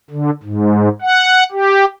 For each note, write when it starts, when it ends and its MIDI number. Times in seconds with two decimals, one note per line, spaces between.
0.11 0.30 50
0.43 0.89 44
1.02 1.44 78
1.52 1.85 67